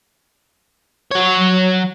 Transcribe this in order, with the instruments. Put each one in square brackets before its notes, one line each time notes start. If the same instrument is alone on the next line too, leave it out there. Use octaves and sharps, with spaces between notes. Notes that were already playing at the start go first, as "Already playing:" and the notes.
[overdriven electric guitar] F#3 C#5